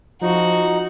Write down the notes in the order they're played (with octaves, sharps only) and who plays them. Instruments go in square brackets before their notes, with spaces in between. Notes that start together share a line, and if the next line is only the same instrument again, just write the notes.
[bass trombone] F3 [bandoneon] D#4 [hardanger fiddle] F#4